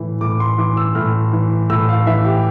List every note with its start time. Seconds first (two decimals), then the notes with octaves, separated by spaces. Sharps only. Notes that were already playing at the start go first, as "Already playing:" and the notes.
Already playing: A2 E3
0.21 A2 D6
0.40 C6
0.58 E3 D6
0.77 E6
0.95 A2 F6
1.33 E3
1.70 A2 E6
1.89 F5
2.07 E3 E5
2.25 G4